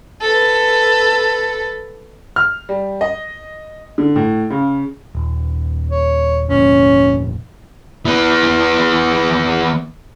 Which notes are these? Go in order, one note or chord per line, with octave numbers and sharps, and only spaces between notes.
A4 B4
F6
G3
D#5
D3
A2
C#3
D#1
C#5
F1 A#1 C#4
E3 B3